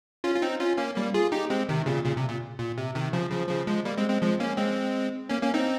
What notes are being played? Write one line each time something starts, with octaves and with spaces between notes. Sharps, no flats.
C#4 F4
F4
C4 D#4
C#4 F4
A#3 C#4
G3 A#3
F4 G#4
D#4 G4
G#3 C4
C3 D#3
A#2 C#3
A#2 C#3
C3
A#2
A#2
C3
C3 D#3
C#3 F3
C#3 F3
C#3 F3
F3 G#3
G3 A#3
G#3 C4
G#3 C4
F3 G#3
A#3 C#4
G#3 C4
A#3 C#4
A#3 C#4
C4 D#4